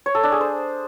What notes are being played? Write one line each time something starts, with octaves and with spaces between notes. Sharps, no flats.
C#5
A4
D4
G#4
C5